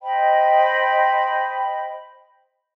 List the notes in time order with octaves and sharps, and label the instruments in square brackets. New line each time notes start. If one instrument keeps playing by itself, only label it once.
[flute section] C5 D#5 G5 B5